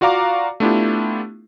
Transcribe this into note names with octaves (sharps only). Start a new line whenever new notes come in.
F4 F#4 D5 F5 A#5 D6
A3 B3 D4 E4 F4 G4